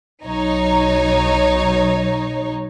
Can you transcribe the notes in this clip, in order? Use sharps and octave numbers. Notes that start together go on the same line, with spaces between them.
B1 F#3 D#4 C#5